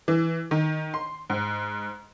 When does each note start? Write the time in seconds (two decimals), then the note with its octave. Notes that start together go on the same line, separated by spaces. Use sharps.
0.08 E3
0.51 D#3
0.94 C6
1.30 G#2